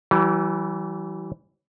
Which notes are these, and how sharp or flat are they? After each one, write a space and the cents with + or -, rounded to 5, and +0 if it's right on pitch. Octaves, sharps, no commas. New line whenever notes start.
E3 +0 G3 -45